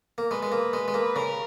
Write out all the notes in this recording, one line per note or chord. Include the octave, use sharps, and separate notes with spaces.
A#3
G#3 B4
G#3
A#3
G#3
G#3
A#3
C#3 A#4